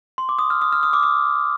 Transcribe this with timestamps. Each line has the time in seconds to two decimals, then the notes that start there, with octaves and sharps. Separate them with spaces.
0.18 C6
0.29 D6
0.39 D#6
0.50 F6
0.62 D#6
0.72 F6
0.83 D#6
0.93 D6
1.03 D#6